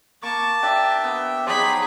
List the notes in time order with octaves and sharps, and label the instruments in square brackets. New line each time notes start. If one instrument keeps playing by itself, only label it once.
[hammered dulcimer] A#3 [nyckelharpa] A5 [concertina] C#6 D6
[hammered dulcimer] D4 [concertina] G4 E5 G5
[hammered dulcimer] B3
[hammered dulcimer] F3 F#3 D#4 [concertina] G4 C5 D5 [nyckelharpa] G#4 B5